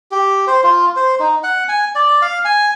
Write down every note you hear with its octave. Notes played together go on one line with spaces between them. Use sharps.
G4
C5
F4
C5
D#4
F#5
G#5
D5
F5
G#5